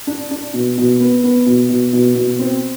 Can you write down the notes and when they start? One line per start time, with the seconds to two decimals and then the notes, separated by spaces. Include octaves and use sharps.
0.07 D4
0.31 D4
0.54 B2
0.78 B2
1.00 B3
1.24 B3
1.46 B2
1.69 B2
1.93 B2
2.15 B2
2.39 C4